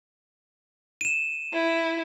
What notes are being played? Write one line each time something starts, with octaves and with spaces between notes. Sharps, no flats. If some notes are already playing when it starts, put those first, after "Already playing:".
D#7 E7
E4